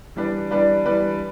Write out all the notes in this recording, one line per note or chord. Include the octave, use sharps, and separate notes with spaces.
E3 G3 D4 B4 D5
E3 G3 D4 B4 D5
E3 G3 D4 B4 D5